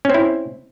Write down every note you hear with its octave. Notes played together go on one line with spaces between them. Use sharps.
C4 C#4 E4